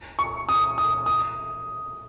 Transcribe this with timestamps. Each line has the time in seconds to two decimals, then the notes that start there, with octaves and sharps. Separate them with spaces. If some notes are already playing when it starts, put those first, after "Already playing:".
0.19 C#6
0.49 D#6
0.78 D#6
1.06 D#6